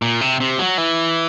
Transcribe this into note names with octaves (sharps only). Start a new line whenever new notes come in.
A#2
C3
C3
F#3
E3